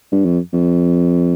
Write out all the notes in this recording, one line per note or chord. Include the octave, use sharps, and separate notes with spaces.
G2
F2
F2